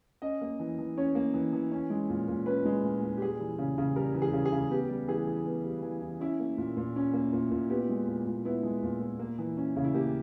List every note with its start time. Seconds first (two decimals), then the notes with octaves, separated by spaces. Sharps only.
0.22 C#4 D#5
0.41 A#3
0.60 E3
0.79 E3
0.97 C#4 C#5
1.15 A#3
1.34 E3
1.53 E3
1.72 C#4
1.90 G#3
2.10 A#2
2.28 A#2
2.46 C#4 B4
2.65 G#3
2.84 A#2
3.02 A#2
3.17 G4
3.21 G3 G#4
3.40 E3
3.58 C#3
3.78 C#3
3.96 G3 A#4
4.14 E3
4.22 G#4
4.33 C#3
4.45 G#4
4.52 C#3
4.70 B3 G4
4.89 G3
5.08 E3 G#4
5.27 E3
5.46 B3
5.65 G3
5.83 E3
6.01 E3
6.20 C#4 E4
6.40 A#3
6.58 A#2
6.77 A#2
6.96 C#4
7.14 A#3
7.33 A#2
7.51 A#2
7.70 B3 G4
7.89 G#3
8.07 A#2
8.26 A#2
8.45 B3 E4
8.63 G#3
8.83 A#2
9.01 A#2
9.19 A#3
9.39 E3
9.57 C#4
9.76 C#3
9.84 E4
9.94 A#3 G4